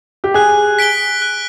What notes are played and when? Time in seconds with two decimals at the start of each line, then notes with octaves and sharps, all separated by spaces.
0.24 G4
0.34 G#4 F#6
0.79 B6 D7 G7
1.22 F#6